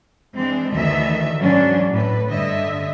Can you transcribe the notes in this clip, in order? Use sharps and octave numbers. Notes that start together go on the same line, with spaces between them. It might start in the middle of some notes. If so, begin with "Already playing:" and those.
E3 G#3 C4 D4
D2 D#3 E3 D#5 E5
G#2 E3 F#3 C#4 D4
A2 B4
G2 D3 D#5 E5